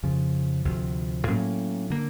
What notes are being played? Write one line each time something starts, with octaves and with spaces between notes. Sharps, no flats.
F2 C#3 F3
D2 C3 F3
A2 F#3 A#3 C#4
D3 G3 A#3